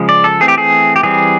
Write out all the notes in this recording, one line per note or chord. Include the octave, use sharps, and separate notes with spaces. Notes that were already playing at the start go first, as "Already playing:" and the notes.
Already playing: C#3 F3 G#3
D5
A4
E3 A3 C4 G#4
G4
G#4
G4
E3 G3 C4 G#4